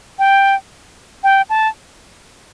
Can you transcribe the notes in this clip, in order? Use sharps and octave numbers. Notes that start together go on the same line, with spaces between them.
G5
G5
A5